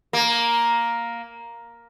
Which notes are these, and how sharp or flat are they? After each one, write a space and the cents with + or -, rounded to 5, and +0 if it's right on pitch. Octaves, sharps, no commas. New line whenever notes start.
A#3 +5